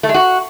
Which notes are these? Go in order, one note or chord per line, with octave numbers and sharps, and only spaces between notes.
A3
G#3
F#4